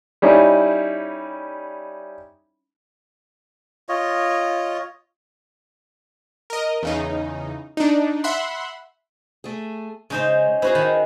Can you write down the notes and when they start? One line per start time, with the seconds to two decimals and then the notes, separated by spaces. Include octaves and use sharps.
0.22 G3 C#4 D#4 E4
3.89 F4 C#5 D#5
6.50 A#4 D#5
6.83 E2 C#3 D#4
7.77 D4 D#4
8.24 E5 F#5 B5 C6
9.44 A3 G#4
10.10 C#3 G#3 C#4 D#4 C5
10.62 C#4 D#4 E4 F#4 G#4 C5
10.75 D#3